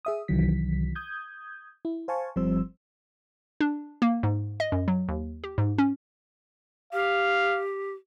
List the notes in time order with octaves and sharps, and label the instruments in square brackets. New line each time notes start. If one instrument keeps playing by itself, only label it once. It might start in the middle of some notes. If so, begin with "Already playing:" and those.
[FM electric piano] G#4 E5 D#6
C2 D#3 E3 F#3 B6
D#6 G6 G#6
E4
C5 F5 G#5 A5 C#6
G1 F3 G3 C4 C5 E6
[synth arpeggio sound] D4
A#3
G#2
D#5
F#2
F#3
D#2
G4
G#2
C#4
[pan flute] G4 [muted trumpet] F5